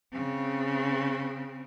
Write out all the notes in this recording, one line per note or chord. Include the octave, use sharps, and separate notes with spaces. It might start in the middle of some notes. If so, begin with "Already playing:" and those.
C#3 C4